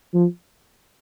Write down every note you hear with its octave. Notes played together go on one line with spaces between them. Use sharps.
F3